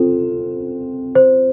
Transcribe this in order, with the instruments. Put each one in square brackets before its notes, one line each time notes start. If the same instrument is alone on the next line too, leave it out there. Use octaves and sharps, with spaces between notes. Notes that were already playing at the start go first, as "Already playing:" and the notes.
Already playing: [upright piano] C4 F4 [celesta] A4
[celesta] C5